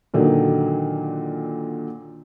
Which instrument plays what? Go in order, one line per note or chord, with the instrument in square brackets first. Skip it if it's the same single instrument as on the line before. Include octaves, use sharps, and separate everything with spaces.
[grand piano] A#2 D3 D#3 F#3